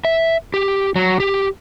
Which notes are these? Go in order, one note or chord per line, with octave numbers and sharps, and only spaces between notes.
E5
G4
F#3
G4